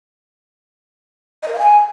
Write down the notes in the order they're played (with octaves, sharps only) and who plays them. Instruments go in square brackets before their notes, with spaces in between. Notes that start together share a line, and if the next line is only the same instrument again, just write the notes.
[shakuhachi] D#5
A#4
F5
G#5